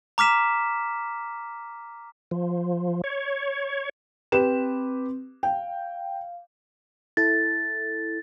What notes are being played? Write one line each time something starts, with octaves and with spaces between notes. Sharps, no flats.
A#5 D6 F6 B6 E7
F3
C#5
C4 G4 B4 E7
F5 G5
E4 A4 A6